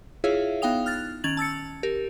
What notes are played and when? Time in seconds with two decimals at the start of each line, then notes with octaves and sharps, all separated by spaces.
0.24 E4 F4 G#4 C#5 E5 F5
0.62 B3 D#4 F5 G5 D#6 F7
0.86 F6 F#6 A6
1.24 D#3 C#4 G#6 A6 F7 F#7
1.37 A5 E6 A6 C#7
1.83 G4 A#4